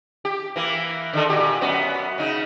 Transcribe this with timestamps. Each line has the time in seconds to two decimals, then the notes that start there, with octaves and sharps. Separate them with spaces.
0.25 G4
0.56 E3 A#3
1.13 D3 D#3 A4
1.30 A#2 F#4 G4
1.61 F#2 B3 F#4
2.18 C#3 D#4